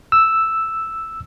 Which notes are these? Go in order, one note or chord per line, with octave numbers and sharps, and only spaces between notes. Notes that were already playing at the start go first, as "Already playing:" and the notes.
E6